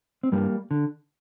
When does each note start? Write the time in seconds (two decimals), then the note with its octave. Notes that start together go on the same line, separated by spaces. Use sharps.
0.23 C4
0.32 G2 G3 A#3
0.71 D3